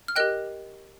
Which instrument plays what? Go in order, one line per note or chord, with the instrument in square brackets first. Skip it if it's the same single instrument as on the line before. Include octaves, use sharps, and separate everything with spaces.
[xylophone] F6
G4 A#4 D#5 G5 F#6